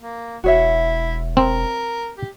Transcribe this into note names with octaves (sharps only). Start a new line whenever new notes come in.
A#3
E1 E4 F#4 C#5 E5
C4 A#4
G4